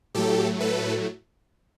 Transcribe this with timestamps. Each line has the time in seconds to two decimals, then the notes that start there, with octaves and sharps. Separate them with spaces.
0.15 A2 F#3 A3 G4 A4
0.60 A4 B4